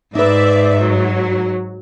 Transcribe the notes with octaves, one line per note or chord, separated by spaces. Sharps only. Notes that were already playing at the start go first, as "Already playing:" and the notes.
G#2 D#4 B4 D5 E5
F#3